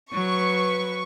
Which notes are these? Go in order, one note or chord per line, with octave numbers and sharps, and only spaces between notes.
F#3 B4 C#6